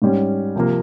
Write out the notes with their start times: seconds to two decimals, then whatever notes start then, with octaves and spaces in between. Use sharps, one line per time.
0.02 G#2 G3 C#4
0.56 C3 F3 A#3